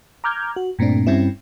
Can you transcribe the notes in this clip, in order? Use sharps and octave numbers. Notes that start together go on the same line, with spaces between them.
A#5 D6 F6 G6 G#6
F#4
G2 A#2 A3 C4 D4
G2 G3 C4 C#4 E4